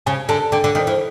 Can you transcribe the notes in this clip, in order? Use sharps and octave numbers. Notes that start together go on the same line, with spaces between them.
C#3 G#5
D3 A5
D3 G5
D3
D#3 G5
E3